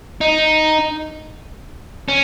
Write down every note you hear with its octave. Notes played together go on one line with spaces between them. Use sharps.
D#4
C#4